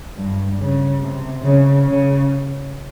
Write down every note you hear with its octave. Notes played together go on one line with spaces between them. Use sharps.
G2
C#3
C3
C#3
C#3